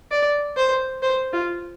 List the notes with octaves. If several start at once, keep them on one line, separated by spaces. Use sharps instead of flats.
D5
C5
C5
F4